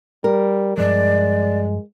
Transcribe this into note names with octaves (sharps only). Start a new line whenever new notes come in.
G3 A#4
G2 F3 G#3 D5